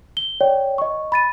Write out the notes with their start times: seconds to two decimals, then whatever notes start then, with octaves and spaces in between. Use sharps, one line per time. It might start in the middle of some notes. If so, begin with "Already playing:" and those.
0.17 G7
0.41 C#5 D5 G5
0.78 D#5 C#6
1.12 B5 A6 D#7